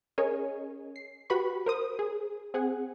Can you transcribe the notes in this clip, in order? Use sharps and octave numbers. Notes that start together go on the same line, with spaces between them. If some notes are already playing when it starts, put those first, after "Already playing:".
C#4 G#4 A#4 C#5 D#5 G#5
C7
F#4 G4 B4 B5 C#6
A#4 C5 D#6
G#4
C4 G#4 F#5 G#5